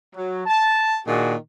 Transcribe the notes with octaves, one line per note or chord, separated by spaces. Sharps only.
F#3
A5
A#2 D#3 D4 F#4 G#4